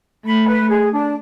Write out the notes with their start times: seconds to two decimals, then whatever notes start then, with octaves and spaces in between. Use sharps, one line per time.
0.24 A3 B5
0.47 B4
0.69 G#4
0.92 D4